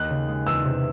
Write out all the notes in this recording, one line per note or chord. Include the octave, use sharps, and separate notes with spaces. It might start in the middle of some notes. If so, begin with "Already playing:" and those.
Already playing: D#2 D#4 F#6
C#3
G#3
E2 E6
C3